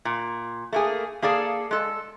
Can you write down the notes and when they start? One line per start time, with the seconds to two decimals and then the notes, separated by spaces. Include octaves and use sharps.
0.05 A#2
0.72 A3 A#3 G#4
1.22 A#3 G#4 A4 D5 F5
1.71 G#3 A4